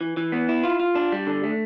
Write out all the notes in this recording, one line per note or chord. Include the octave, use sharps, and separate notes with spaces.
E3
E3
B3
E4
F4
F4
D4
G3
D3
A3